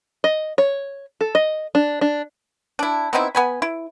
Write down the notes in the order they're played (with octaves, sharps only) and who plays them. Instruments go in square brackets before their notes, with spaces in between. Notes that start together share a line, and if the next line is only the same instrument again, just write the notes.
[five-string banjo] D#5
C#5
A4
D#5
D4
D4
[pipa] D4 E4
B3 C4 D#4 E4
B3 G#5 B5
E4